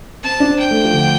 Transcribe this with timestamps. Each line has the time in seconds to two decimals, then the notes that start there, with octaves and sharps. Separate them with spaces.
0.24 C4 A5
0.40 D4
0.47 C4
0.59 G5
0.71 A3
0.84 F3
0.93 D3